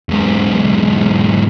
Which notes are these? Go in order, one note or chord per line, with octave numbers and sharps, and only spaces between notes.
E2 G#2